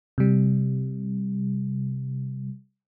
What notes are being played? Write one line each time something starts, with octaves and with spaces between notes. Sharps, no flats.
C3 G3